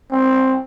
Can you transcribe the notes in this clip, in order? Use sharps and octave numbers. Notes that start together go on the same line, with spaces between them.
C4